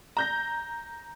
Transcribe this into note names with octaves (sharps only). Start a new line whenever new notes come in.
A#5 G6 A#6